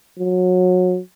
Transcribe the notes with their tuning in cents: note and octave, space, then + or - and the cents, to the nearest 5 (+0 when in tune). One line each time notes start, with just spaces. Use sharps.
F#3 -25